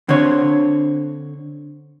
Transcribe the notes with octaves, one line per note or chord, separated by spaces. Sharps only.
D3 C4 C#5